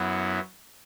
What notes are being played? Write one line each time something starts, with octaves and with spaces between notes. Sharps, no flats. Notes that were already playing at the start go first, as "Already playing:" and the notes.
Already playing: F#2 F#3 B3 E4